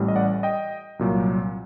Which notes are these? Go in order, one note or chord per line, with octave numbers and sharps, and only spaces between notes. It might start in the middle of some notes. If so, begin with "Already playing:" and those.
Already playing: A1 A2 G3
D#5
D5 F#5
D#5 G5
C2 A#2 F#3